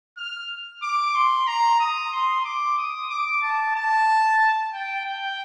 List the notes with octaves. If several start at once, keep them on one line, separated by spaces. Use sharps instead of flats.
F6
D6
C6
A#5
D#6
C6
D6
D#6
D6
A5
A5
G5
G5